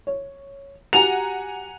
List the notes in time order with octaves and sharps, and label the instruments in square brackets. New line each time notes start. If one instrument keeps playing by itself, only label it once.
[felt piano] C#5
[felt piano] F#4 G4 [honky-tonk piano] F#5 G#5 A#5 [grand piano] F7